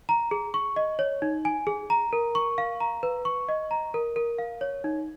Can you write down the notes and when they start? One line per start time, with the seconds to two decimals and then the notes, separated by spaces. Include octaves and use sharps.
0.09 A#5
0.31 G#4
0.54 C#6
0.76 D#5
0.99 C#5
1.22 D#4
1.45 G#5
1.67 G#4
1.90 A#5
2.13 A#4
2.35 C#6
2.58 F5
2.80 A#5
3.03 B4
3.25 C#6
3.49 D#5
3.71 A#5
3.94 A#4
4.16 A#4
4.38 F5
4.61 C#5
4.84 D#4